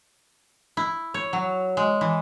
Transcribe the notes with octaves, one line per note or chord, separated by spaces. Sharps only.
E4
C#5
F#3
G#3
E3